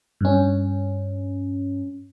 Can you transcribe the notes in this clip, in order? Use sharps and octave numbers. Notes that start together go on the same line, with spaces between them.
G2 C#4